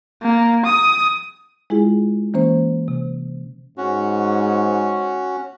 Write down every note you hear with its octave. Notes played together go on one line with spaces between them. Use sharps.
A#3
D#6
G#3 E4 F4 G#4
E3 A#3 C#4 C5
C3
G#2 C#4 F#4